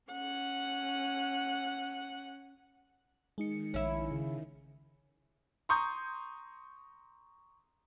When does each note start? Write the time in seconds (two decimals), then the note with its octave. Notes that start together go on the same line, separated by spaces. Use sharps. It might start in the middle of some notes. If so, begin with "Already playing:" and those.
0.12 C#4 F#5
3.38 D#3 G#3 D#4 C#7
3.74 A#1 C#4 E4
4.11 C#3
5.69 A#5 C6 C#6 D#6 G6